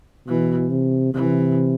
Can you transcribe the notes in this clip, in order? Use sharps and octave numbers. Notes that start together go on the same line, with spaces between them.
B2 E3
C3
C3 E3